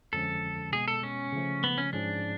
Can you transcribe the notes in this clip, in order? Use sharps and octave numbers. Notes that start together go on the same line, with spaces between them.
F2 D3 F3 G#3 C#4 A4
B2 G#3 B3 G#4
A4
C#4
C#3 F3 A3
B3
C#4
G#2 F3 G#3 C#4 D4 G#4